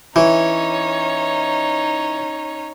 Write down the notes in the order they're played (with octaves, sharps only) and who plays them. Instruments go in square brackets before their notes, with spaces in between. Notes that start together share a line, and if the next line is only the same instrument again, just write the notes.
[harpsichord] E3 [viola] C#4 C#5 [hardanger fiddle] D#4